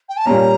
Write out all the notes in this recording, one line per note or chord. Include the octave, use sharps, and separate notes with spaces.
G5
A5
A#2 G3 A#3 C#4 A#5